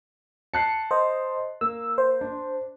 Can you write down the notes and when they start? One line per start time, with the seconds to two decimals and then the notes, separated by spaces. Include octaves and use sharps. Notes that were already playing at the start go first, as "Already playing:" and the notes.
0.54 A5 F#6 C7 C#7
0.91 C5 D#5
1.61 A#3 E6
1.98 C5
2.21 D4